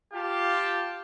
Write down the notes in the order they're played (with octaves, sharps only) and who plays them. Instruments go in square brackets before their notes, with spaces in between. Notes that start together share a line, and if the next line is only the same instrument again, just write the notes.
[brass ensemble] F4 F5 A5 [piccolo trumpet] G4